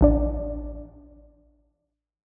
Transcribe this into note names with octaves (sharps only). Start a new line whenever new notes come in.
A1 D4 D5